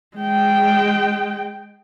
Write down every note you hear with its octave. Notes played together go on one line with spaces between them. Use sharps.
G#3 G5